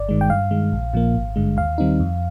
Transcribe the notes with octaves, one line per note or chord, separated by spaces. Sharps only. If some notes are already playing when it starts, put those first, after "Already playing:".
Already playing: G1 D5
G2 D#3 G#3
G5
G2 F5
D#3 G#3
A#1
A#2 F3 A#3
G#1
G2 D3 G#3
D#2 F5
D#3 G3 C4 D#4
F2